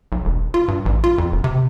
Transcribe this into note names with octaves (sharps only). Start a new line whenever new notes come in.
B1
E1
F4
G2
A1
F4
F2
E1
C3